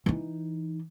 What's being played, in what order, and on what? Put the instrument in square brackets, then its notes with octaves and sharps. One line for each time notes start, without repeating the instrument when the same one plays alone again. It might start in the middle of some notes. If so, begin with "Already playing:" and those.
[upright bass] E3 D#4